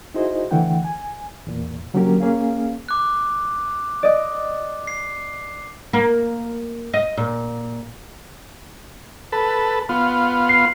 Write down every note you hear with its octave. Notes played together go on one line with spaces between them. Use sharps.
D#4 E4 F#4 G#4 C5 D#5
D3 E3 A3 F#5 G5
G#5
E2 A#2
D3 F#3 A#3 C#4 G4 A#4
A#3 C#4 G#4 F5
D6 F#6
D5 D#5
C7
A#3
D#5
A#2
A4 B4
B3 F4
C7